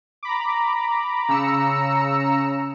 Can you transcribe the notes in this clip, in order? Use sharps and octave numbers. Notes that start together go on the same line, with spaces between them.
A#5 B5 D6
C#3 A#5 E6 C#7